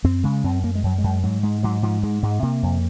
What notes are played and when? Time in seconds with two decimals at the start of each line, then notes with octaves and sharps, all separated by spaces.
0.04 F#2 C4
0.24 C#3 G#3
0.44 F#2 C4
0.63 F#2 A#3
0.75 G#3
0.83 F#2 F#3
0.98 G#3
1.04 F#2
1.24 G#2 F#3
1.43 G#2 G#3
1.63 G#2 F#3
1.83 G#2 F3
2.03 G#2 G#3
2.23 G#2 G#3
2.43 C3 A#3
2.63 F2